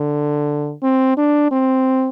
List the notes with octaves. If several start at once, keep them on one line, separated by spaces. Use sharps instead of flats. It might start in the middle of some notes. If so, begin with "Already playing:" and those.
Already playing: D3
C4
D4
C4